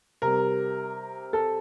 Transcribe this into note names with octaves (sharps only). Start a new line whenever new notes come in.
C3 G3 A#4
A4